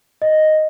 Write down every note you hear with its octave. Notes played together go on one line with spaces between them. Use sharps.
D#5